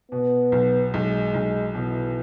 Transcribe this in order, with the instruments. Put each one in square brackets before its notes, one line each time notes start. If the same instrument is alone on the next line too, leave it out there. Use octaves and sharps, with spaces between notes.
[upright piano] B2 [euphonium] B3
[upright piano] B1
[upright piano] B1 [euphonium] G#3
[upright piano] B1
[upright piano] B2 [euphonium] E3